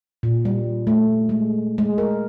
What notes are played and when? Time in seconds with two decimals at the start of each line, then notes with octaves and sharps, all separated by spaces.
0.23 A#2
0.45 G3
0.87 A3
1.29 G#3
1.78 G#3
1.98 A#4